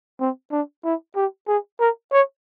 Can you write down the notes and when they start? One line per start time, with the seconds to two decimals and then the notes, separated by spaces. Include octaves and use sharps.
0.20 C4
0.52 D4
0.84 E4
1.16 G4
1.47 G#4
1.80 A#4
2.12 C#5